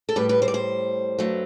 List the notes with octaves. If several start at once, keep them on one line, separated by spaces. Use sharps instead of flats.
A4
A2 G3 B4
B4
C5
D5
C5
G2 F#3 A3